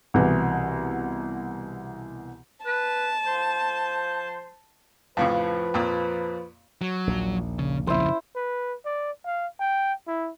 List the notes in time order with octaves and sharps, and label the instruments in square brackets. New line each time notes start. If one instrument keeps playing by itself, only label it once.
[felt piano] C2 B2 E3
[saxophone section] B4 [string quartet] A5
[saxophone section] F3 C5
[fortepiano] F2 A2 C#3 [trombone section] F3 B4 [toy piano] F5
[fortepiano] F2 A#2
[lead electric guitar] F#3
[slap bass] A#1 D#2 A#2
[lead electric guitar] C#3
[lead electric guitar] F2 C#3 [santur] E4 C5
[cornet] B4
D5
F5
G5
E4